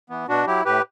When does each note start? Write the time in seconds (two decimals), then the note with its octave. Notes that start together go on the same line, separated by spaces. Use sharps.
0.10 E3 B3
0.29 B2 D4 F#4
0.47 F#3 E4 G4
0.65 A2 G4 B4